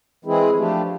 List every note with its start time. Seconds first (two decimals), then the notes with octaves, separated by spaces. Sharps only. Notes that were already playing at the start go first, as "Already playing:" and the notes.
0.25 E3 G#3 C4 E4 G#4
0.57 F3 A3 D4 G4